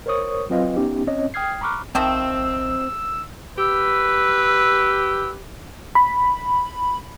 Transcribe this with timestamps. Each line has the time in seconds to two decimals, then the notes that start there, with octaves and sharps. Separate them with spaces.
0.06 A#4 C5 C#5 C#6 D#6
0.50 F#3 C4 F4 B4 D#5 F5
0.77 B3 C#4 D#4 G4
1.07 C4 C#4 C#5 D#5
1.34 G5 D#6 F6 G#6 C7
1.61 A#5 B5 C#6 D6 F6 F#6
1.95 A#1 C3 D#3 F3 C4 E6
3.58 G4 B4 E6
5.95 B5